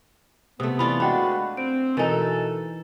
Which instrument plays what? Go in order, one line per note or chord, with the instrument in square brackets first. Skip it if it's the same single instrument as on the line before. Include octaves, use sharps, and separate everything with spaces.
[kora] C3 A3 [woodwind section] B3 [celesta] D#6
[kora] E3 F4 D5 [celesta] B5
[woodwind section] G#3 F#4 B4 [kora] D4 [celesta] F#5 G5 B5
[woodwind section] C4 [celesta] D7
[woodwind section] B2 A4 [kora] E3 D#4 [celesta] A#4 G#5